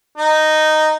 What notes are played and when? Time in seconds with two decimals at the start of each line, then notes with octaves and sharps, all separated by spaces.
0.18 D#4